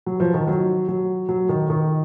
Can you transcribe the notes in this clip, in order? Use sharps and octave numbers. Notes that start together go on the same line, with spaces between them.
F#3
F3
D#3
F#3
F#3
F#3
D#3
D#3